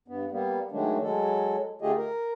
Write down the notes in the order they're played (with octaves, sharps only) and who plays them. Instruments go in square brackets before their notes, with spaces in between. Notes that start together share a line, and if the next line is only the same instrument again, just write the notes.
[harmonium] G2 B3
G3 A#3 B3
D#3 F#3 G#3 A3 D4
F#3 G#3 A4
D3 A3 F4 G4 G#4 D#5
A#4